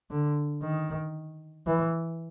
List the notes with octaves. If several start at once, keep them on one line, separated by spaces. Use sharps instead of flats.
D3
D#3
E3